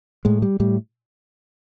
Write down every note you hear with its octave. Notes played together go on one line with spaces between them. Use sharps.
A2 G#3
G3
A2 G3